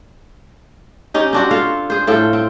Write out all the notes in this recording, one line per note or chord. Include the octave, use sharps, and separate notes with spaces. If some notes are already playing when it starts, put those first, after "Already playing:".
C#4 D#4 G4
C4 D4 F#4
F4 A4 F5
G#4 C5
A2 F4 A4 G5
C4